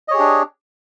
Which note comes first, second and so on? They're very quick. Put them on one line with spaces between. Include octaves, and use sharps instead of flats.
D#5 C#5 G#4 G4 D4